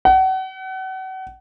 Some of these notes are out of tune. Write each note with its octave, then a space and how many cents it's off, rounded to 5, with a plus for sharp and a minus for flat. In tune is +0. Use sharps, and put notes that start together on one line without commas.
F#5 +35